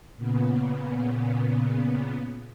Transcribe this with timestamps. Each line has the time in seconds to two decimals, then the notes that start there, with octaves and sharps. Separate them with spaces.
0.16 A#2 C#3 B3